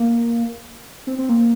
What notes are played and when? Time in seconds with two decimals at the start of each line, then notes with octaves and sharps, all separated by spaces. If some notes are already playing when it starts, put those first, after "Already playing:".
Already playing: A#3
1.07 C4
1.18 C4
1.29 A#3